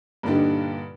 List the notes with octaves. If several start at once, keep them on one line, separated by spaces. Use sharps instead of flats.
G2 A#2 D3 D4 D#4 G4